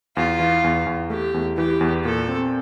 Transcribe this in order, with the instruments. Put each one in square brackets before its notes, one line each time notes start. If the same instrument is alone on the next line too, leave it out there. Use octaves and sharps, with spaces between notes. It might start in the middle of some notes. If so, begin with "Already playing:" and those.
[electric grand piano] E2 [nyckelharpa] F4
[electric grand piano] E3
E2
E2
[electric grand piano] A3 [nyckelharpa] G4
[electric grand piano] E2
[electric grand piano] E3 [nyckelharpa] G4
[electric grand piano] E2
[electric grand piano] A#2 [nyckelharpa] A4
[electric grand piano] C4